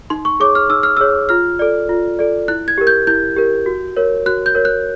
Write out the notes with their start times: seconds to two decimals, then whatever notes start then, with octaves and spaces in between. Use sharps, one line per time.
0.10 D#4 C6
0.25 C#6
0.40 G#4 C#5 D6
0.55 F6
0.69 D#4 E6
0.83 F6
0.97 G#4 C#5 E6
1.29 F4 F6
1.59 A4 D5
1.89 F4
2.19 A4 D5
2.48 E4 F#6
2.68 G#6
2.78 G4 A#4
2.87 G6
3.07 E4 G6
3.36 G4 A#4
3.66 F#4
3.97 A#4 C#5
4.26 F#4 F#6
4.46 G6
4.55 A#4 C#5
4.65 F#6